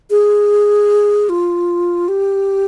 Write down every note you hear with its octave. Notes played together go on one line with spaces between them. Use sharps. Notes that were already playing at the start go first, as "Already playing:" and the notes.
G#4
F4
G4